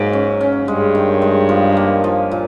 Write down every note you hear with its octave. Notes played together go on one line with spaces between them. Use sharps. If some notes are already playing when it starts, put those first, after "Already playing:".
Already playing: G#2 F#3 A#3
C#4
C#4
G2 G#3
D#3
G#3
F3
A#3
F3
A#2